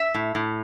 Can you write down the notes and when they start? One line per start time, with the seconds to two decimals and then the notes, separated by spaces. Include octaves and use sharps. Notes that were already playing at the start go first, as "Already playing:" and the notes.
Already playing: E5
0.14 A2
0.35 A2